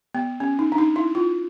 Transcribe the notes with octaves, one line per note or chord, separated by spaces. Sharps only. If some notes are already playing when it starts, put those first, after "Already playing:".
B3
C#4
D#4
D4
D#4
E4
F4